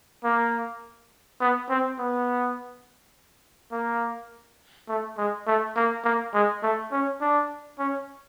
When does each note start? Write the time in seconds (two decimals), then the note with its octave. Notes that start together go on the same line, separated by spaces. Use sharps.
0.24 A#3
1.40 B3
1.70 C4
1.99 B3
3.72 A#3
4.89 A3
5.18 G#3
5.47 A3
5.76 A#3
6.05 A#3
6.34 G#3
6.63 A3
6.92 C#4
7.21 D4
7.79 C#4